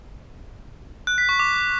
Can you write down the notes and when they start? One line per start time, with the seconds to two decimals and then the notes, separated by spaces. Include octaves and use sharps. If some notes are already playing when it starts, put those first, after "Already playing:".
1.07 F#6
1.18 B6
1.29 C#6
1.40 D6